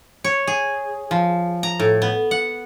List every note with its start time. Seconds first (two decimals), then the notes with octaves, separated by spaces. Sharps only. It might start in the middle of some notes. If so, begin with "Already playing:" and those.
0.24 C#5
0.47 G#4
1.11 F3
1.63 A#5
1.80 A2
2.02 B3
2.31 F#5